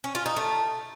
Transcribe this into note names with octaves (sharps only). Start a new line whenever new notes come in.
C#4
F4
D#4
A3